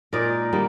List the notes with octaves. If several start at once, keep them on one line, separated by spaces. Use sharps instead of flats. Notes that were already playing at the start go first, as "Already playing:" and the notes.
A#2 G#3 D#4 A#4 D5
D#3 G3 A#3